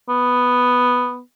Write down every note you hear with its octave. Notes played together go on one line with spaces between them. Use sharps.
B3